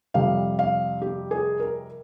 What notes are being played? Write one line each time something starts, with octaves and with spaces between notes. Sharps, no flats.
F2 C3 G3 F5
F5
G4
G#4
A#4